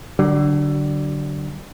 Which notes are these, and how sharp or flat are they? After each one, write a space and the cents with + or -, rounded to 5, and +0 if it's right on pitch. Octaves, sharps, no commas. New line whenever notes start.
D3 +0 F#3 +40